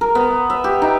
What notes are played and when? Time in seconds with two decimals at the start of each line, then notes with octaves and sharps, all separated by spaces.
0.01 A#4
0.15 B3
0.50 E5
0.64 G4
0.82 D#4 E5